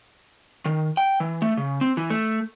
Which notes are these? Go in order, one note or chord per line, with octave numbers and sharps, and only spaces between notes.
D#3
G5
E3
A3
C#3
C4
E3
A3